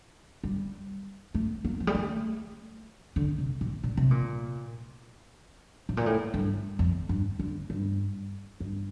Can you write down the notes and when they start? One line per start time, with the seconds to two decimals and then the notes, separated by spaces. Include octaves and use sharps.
0.44 G3
1.34 A3
1.65 A#3
1.80 F3
1.87 G3
1.95 A3
3.16 D3
3.38 C3
3.61 A#2
3.83 A#2
3.97 C3
4.11 A#2
5.89 A2
5.97 A#2
6.06 A2
6.34 G2
6.79 F2
7.09 G2
7.39 D3
7.70 G2
8.60 G2